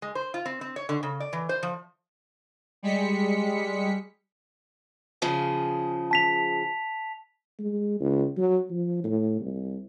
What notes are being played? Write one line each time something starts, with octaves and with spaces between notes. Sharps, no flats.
G#3
C5
F4
C4
C4
C#5
D3
C#3
D5
E3
C5
F3
G3 G#3 B6 C#7
C#3 F3 G#4
A5 B6 F7
G#3
C#2
F#3
F3
A2
C2